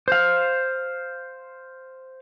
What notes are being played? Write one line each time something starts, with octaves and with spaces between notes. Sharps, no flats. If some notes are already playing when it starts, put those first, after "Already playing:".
C5 F5